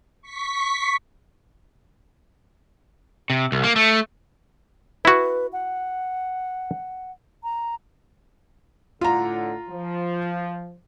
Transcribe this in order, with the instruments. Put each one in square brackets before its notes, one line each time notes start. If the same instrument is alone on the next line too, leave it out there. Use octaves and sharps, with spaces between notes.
[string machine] C#6 B6
[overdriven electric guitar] C3
C2
A#3
A3
[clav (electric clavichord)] E4 F#4 [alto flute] B4
[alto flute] F#5
A#5
[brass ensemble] A2 D3 F#5 [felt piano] F4 A#5
[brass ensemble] F3